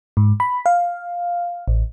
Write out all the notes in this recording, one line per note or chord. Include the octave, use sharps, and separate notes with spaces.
G#2
B5
F5
A1